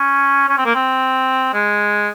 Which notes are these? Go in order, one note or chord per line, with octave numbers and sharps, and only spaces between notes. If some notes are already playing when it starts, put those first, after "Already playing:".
Already playing: C#4
C#4
C4
A#3
C4
G#3